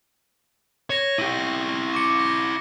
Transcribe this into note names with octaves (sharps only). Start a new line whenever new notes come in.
C#5 C#6 A#6
E4 G4 D#7
C#6 D6 C#7
A#6